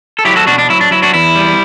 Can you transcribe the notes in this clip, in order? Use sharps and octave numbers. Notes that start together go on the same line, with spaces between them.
A4
F#3 E4 G4
F#4 A4
B2 D4 F#4
D4
F#3 E4
D4
F#3 E4
D4 F#4
E2 E4
G3